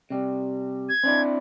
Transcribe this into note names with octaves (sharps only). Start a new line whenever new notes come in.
C3 G3
G#6
C4 D4 E4